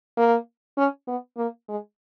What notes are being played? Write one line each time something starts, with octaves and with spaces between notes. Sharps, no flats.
A#3
C#4
B3
A#3
G#3